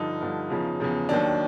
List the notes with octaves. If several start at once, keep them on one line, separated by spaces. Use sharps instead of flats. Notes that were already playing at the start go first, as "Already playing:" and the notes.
Already playing: G2 D3 F3 D#4
G2 D3 F3
E2 C#3 F3
E2 C#3 F3
D#2 D#3 F#3 D4